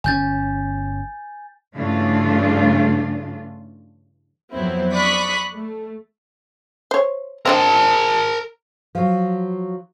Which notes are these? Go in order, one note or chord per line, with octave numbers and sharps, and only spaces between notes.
G1 A#2 C#4 G#5 G6 A6
G2 C#3 E3 A3 D4 F4
F2 F3 F#3 B3 C4 E4
D5 B5 C#6 D#6 F#6 B6
A3
C5 C#5
C4 D4 A#4 D#5 A5
F3 F#3